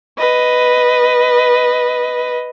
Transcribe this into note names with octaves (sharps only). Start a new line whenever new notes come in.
B4 D#5